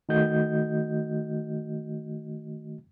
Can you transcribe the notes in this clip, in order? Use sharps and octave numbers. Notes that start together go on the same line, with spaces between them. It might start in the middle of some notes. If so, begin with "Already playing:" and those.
D#3 A3 F#4 D#5 G6